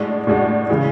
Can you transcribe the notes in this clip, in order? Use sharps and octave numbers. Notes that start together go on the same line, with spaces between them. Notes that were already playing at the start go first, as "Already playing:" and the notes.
Already playing: A2 G#3 D4 F#4
A2 G#3 D4 F#4
C#3 E3 G#3